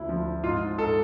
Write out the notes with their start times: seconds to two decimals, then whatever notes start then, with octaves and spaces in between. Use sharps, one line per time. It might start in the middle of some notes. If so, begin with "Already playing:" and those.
Already playing: D2 E4
0.09 F3
0.44 G#2 F4
0.78 G#2 A4